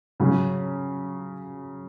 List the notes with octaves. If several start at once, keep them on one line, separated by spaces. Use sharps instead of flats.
C#3 F#3 C#4